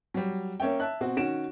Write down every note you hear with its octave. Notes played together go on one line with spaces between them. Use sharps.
F#3 G3
A#3 C#4 C#5 E5 G5
E5 A5 F#6
B2 C4 F#4
D#3 C#4 F#4 D7 E7